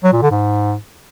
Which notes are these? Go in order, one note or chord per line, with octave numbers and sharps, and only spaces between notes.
F#3
A#2
D3
G#2